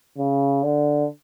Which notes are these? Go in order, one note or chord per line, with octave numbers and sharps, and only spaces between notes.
C#3
D3